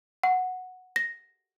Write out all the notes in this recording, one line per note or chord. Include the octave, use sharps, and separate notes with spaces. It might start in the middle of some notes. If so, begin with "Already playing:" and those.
F#5
A#6